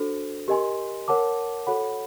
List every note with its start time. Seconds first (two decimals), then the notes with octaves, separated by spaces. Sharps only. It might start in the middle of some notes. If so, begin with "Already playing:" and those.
Already playing: D4 F#4 A4 C5
0.48 G4 A#4 D#5 G#5 C6
1.08 A#4 C#5 F#5 A5 D6
1.67 F#4 A4 C#5 F#5 B5